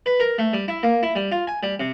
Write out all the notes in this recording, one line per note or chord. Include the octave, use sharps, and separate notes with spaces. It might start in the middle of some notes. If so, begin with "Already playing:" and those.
B4
A#4
A3
G3
E4
A#3
E4
G3
F4
G#5
G3
C3